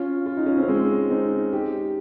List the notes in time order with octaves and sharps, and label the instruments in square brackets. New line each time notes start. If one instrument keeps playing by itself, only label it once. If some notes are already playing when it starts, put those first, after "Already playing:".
Already playing: [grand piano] C#4 F4
F4
D#4
C#4
C4 D#4
C#4
G#3 C4
C4 D#4
D#4 G4